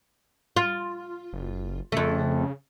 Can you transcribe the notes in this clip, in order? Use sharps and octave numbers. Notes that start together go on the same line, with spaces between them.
F4
F#1
F2 C#3 A3